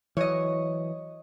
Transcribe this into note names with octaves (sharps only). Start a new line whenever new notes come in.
E3 F#3 C#5 D#5